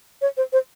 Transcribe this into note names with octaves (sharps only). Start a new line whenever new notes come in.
C#5
C5
C5